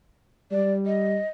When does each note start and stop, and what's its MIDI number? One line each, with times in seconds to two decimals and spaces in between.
0.52 1.19 55
0.52 0.74 74
0.86 1.29 75